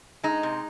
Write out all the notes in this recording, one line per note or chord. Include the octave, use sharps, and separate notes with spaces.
G#3 D#4
C3